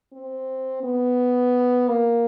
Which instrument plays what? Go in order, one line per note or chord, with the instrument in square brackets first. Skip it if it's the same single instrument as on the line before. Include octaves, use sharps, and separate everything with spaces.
[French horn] C4
B3
A#3